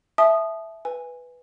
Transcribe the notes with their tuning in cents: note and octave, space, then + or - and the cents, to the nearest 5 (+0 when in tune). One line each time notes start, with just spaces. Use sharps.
E5 +0 A5 -35 D#6 -15
B4 +0 G#5 -10